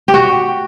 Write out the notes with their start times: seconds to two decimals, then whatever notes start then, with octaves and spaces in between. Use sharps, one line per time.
0.08 G4
0.14 F#4